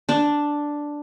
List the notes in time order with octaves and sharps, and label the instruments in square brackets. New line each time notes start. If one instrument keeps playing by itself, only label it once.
[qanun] D4